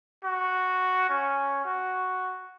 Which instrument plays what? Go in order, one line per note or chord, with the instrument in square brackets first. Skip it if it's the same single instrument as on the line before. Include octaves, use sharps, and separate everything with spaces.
[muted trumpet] F#4
C#4
F#4